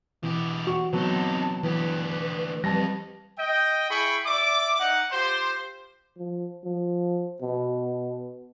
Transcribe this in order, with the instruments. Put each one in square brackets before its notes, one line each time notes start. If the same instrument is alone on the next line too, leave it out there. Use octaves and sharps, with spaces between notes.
[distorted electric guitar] B2 G4 [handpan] E3
[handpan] F#4 [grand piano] C#6
[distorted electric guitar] C3 D#4 [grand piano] F#3 B3 [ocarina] A5
[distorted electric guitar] D2 G4 [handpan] E3 [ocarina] B4
[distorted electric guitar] F2 [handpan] G3 [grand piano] A5 A#6
[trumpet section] D#5 G5
E4 G#4 G5 B5 C#6
D5 E5 D6
D#4 F#5
F4 G4 C5
[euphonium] F3
F3
B2